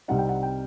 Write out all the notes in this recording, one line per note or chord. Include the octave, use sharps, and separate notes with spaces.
C2 C3 G3 C4 D#4 F#5
G5
F#5
G5